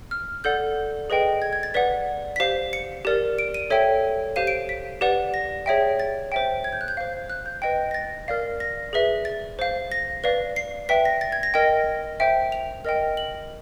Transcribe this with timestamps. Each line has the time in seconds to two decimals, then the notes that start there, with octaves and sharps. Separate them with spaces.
0.11 F6
0.44 A4 D5 F#5 G6
1.10 G#4 B4 D#5 G5
1.42 G#6
1.53 G#6
1.63 A6
1.74 B4 D5 F#5 B6
2.36 B6
2.40 G4 C5 F5 C7
2.73 C#7
3.05 G4 A#4 D5
3.39 D7
3.54 D#7
3.70 A4 C#5 E5 G5
4.36 G4 C5 F5 D#7
4.47 D7
4.69 B6
5.01 G4 B4 D5 F#5
5.34 A#6
5.66 G#4 C#5 E5 G5
6.00 A6
6.32 C5 E5 G5
6.64 G#6
6.72 G6
6.81 F#6
6.88 G6
6.97 C5 F5
7.30 F#6
7.46 G6
7.62 B4 D#5 G5
7.91 A#6
7.94 A6
8.28 A#4 D5 F5
8.60 A#6
8.93 G#4 B4 E5
9.25 A6
9.59 C5 F5
9.92 A#6
10.24 B4 D5 F5
10.56 C7
10.89 B4 E5 G5 B6
11.05 A#6
11.21 A6
11.32 G#6
11.43 A#6
11.54 A#4 D#5 G5
12.20 C5 E5 G5
12.52 F7
12.85 A#4 D#5 G5
13.17 F#7